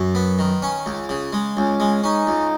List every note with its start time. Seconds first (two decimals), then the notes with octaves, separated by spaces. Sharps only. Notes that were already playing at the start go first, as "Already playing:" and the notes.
Already playing: F#2
0.15 B3
0.39 D#3
0.62 C#4
0.86 C#2
1.09 C#3
1.33 G#3
1.57 C#2 C#4
1.80 G#3
2.04 C#4 D#4
2.27 C#2